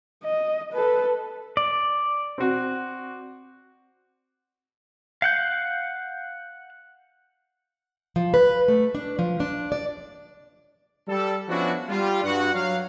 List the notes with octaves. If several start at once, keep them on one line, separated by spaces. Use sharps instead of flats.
D#5
A4 B4
D5
C4 F#4
F5 F#5 G6
F3
B4
A3
D4
F3
D4
D5
G3 A4
F3 B3 C#4 D4 E4 F#4
G3 F4
G2 F#4 F#5
F#3 F5